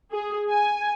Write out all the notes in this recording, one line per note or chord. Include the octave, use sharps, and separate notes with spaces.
G#4
G#5